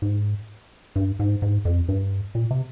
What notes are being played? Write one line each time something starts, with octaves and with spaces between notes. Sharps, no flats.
G#2
G2
G#2
G#2
F2
G2
A#2
C3